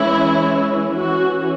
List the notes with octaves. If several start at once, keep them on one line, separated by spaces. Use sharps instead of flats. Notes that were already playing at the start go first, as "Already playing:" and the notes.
Already playing: E3 G#3 C#4 E4
E3 C#4 F#4